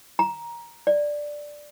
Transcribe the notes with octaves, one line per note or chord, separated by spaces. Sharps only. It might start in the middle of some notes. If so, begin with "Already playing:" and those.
A#5
D5